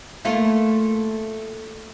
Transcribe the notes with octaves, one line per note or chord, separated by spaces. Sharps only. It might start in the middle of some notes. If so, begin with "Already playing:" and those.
A3 A#3 F4